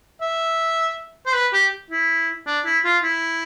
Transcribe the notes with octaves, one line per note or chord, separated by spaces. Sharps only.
E5
C5
B4
G4
E4
D4
E4
F4
E4